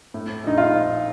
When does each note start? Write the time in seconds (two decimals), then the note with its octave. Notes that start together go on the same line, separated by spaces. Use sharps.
0.14 A2
0.44 A#1 D#4
0.58 F4
0.73 F3